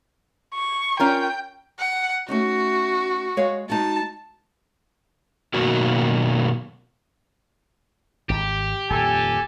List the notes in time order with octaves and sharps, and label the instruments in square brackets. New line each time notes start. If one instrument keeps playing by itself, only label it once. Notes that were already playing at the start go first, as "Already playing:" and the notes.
[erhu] C#6
[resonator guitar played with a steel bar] C#4 F4 A#4 [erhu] G5
[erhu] F#5
[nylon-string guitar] A3 C#4 D#4 [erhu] F#4
[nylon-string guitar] G#3 C#5 F5
[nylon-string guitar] G#3 D#4 F#4 [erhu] A5
[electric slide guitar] B2 D#3 F#3 A#3 F#4
[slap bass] G#1 [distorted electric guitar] G4
[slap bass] D#1 F2 [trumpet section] A4 G#5